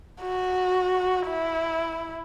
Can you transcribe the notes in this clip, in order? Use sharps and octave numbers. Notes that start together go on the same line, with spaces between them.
F#4
E4